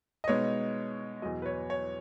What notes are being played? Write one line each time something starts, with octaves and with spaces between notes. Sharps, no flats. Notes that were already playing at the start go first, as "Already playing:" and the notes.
D#5
B2 G#3 B3 D#4 C#5
E2 B2 F#3 D#5
B4
C#5
C#5